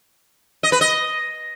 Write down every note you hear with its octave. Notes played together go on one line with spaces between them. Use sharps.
D#5
B4
D#5